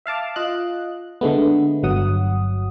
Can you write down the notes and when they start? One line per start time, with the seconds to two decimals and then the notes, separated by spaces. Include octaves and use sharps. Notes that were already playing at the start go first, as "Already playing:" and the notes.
0.06 E5 F5 A5 D6
0.36 F4 D#5 F#6
1.21 D3 G#3 A3 B3
1.83 G1 F#3 F#5 D#6